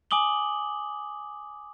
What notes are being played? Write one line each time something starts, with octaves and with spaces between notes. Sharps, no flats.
G#5 D6 D#6 F#7 G7